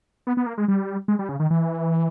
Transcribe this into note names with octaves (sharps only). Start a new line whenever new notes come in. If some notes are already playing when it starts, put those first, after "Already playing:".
B3
B3
A#3
G#3
G3
G#3
G3
C#3
D#3
E3